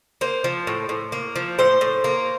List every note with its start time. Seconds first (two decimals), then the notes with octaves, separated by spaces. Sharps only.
0.21 A#3 C5
0.44 F3
0.67 A2
0.89 A2
1.12 A#3
1.36 F3
1.59 A2 C5
1.81 A2
2.04 A#3